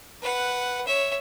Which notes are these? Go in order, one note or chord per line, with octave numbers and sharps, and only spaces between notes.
B4 F#5
C#5 E5